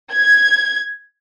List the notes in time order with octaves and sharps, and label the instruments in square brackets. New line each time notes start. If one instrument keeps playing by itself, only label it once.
[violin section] G#6